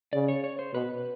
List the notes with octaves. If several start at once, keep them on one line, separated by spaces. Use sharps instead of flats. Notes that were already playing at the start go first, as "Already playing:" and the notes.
C#3 D5
C#5
C#5
C5
B2 B4